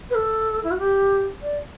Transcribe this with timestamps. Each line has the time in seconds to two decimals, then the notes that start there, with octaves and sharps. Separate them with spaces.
0.10 B4
0.15 A4
0.64 E4
0.71 F#4
0.78 G4
1.42 D5